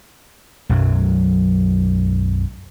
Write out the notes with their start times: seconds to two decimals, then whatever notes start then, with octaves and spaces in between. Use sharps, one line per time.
0.69 B1 F#2 F#3